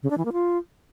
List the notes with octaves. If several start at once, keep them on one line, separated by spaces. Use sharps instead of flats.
C#3
D4
E3
A#3
F4